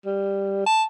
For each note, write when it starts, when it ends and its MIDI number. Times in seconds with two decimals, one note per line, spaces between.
0.06 0.64 55
0.67 0.84 81